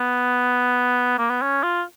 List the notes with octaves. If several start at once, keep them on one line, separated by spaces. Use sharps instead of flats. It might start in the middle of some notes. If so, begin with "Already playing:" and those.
Already playing: B3
A#3
B3
C#4
F4